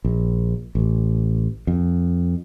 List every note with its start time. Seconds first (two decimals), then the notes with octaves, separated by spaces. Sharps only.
0.04 A#1
0.75 A1
1.67 F2